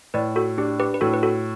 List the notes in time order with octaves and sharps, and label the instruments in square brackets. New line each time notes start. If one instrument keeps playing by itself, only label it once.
[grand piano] A2 [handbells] B4 D5
[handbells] F#4 A4
[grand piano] D4 [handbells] G4
[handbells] G4 B4
B4
[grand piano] A2 [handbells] F#4 A4
[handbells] B4
F#4 A4